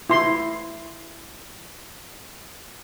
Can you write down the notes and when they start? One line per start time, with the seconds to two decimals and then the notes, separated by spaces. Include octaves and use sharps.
0.10 E4 C6